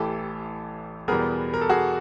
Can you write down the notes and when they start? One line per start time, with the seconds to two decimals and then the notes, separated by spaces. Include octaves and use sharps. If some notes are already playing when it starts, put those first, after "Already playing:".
Already playing: A1 A2 E3 G4 A4
1.08 E2 B2 G3 B3 G#4 A#4
1.54 A#4
1.61 A4
1.69 F#4 G#4